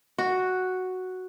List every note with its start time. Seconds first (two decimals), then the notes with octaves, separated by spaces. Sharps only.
0.18 F#4